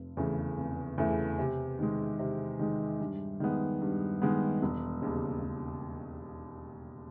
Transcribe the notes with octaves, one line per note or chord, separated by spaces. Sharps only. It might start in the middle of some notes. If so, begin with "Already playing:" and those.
Already playing: F1
E2 C#3 E3 A3
F1
E2 C#3 E3 A3
C3
D#3 G#3
C3
D#3 G#3
G2
D#3 G#3 B3
G2
D#3 G#3 B3
E1
D#2 C#3
E1